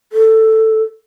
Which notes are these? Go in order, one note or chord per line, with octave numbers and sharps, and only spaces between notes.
A4